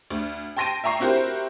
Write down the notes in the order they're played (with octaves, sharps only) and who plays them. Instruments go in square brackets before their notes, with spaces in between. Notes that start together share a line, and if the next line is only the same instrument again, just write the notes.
[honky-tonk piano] D2
G5 A5 C6 A#6 D7 D#7
E5 G5 A#5 C#6 C7
C4 E4 F#4 G4 A#4 C5